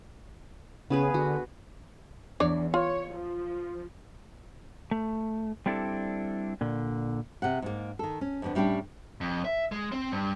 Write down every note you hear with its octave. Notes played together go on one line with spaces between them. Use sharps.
C#3 B3 G#4 B4
D3 F#4
E2 D4 C#5 D5
F4 C#5
F3
A3
G3 C4 D4 E4 A4
A#2 D3
C3 F#5
G#2 A#3
D#3 A4
C#4
F2 D3 B3
A2 G3 C#4 D4 G5
F2
E5
G#3
C4
G2